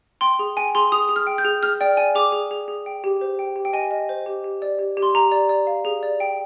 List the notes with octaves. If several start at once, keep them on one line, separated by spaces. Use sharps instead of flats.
G5 C6
G#4
G5 G#5
G#4 C6
G#4 D#6
G#4
F6
G5
G6
G#4
G#4 F6
D5 G5
D5 G#5
G#4 D6
G#4
G#4
G#4
G5
G4
C5
G5
G4
G5
D#5 G#5
D#5
C5
G4
G4
D5
G4
G4
C6
G4 A#5
D5
D5
F5
G#4
D5
G5